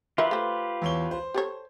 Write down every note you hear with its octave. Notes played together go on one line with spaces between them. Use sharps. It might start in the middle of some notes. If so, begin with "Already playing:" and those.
E3 F4 G4 A#4 B4 E5
A3 C5
E2 C#5 G7
C5
G4 A4 C#5